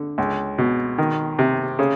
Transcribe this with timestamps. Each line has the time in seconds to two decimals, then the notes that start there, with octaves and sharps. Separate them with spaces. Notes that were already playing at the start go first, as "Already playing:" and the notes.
Already playing: D3
0.18 C#2
0.58 B2
0.98 D#3
1.39 C3
1.79 C#3